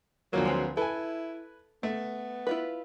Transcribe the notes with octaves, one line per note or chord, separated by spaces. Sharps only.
D2 F3 F#3 A#3
G#3 C4 B4
E4 A4 B4 G#5
A3 B3
E4 F4 B4